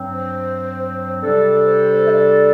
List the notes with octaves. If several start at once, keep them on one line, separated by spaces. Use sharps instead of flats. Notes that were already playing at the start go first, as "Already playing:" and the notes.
Already playing: G2 F#3 C4
C5
C3 G3 D4 A4 D5
C5
E5
D5